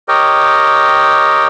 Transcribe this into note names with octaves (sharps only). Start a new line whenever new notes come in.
G4 A#4 C#5 D#5 G5